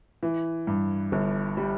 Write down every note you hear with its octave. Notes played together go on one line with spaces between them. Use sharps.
E3
G2
G1
G3